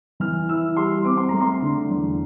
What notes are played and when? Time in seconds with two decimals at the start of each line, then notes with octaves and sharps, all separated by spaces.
0.20 E3 F6
0.49 E4 E6
0.76 G3 C6
1.05 C4 D6
1.17 C6
1.29 A3 A#5
1.41 C6
1.62 D3
1.90 E2